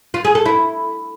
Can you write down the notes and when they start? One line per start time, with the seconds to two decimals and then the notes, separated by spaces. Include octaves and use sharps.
0.14 F4
0.24 G#4
0.35 A4
0.46 E4